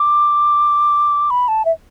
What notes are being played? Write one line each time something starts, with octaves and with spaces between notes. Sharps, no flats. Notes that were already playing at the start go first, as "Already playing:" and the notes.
Already playing: D6
B5
A5
E5